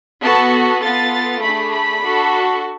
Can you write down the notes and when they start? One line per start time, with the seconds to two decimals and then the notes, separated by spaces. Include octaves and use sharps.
0.22 B3 F#4 A4 A5
0.81 B3 F4 A4 A6
1.41 A3 D4 G#4 B5
1.71 B5
2.01 D4 F#4 A4